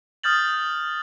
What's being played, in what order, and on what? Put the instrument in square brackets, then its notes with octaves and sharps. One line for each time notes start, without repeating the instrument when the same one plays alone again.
[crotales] D#6 F6 G6 A6 F#7